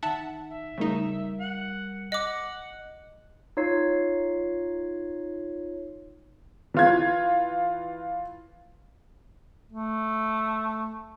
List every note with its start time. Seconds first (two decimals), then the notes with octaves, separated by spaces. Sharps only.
0.03 D#3 D#4 E5 F#5 A5
0.51 E5
0.78 C#3 G3 A3 D#4 A#4
1.40 F#5
2.12 D#5 F#5 D6
3.57 D#4 F4 C#5 G#6 C7
6.74 E3 F4 G#6
9.72 A3